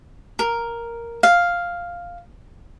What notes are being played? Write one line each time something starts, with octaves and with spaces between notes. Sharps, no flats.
A#4
F5